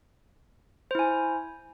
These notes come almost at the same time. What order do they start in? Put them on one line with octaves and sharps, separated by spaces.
C5 E4 G#5